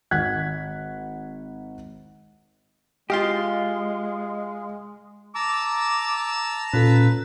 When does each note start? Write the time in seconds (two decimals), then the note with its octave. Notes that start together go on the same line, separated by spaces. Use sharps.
0.11 G#1 F#5 F#6 G#6 B6
3.10 G#3 F4 G4 D#5 F5 C6
5.35 A5 A#5 D6 E6
6.73 A#2 C#4 F4 A4 B4